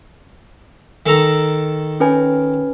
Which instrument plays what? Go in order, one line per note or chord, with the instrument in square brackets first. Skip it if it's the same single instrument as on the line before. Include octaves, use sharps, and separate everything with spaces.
[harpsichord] D#3 A4 A#5
[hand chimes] C#4 B4 G#5